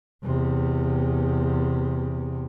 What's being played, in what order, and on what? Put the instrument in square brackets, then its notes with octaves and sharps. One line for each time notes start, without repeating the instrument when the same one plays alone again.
[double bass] E2 C3